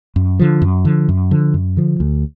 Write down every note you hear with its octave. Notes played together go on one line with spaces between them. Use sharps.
F#2
D3 F3
F#2
D3 F3
F#2
D3 F3
F#2
D3 F3
D2